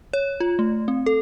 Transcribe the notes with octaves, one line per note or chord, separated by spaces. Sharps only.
C#5
F4
A3
C4
A4